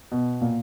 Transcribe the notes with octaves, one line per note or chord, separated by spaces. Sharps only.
B2
A#2